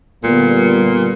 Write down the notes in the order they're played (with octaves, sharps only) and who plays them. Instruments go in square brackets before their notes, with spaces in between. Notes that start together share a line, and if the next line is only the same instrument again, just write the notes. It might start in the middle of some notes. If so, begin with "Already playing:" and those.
[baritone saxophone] A#2 [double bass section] D3 G3 B3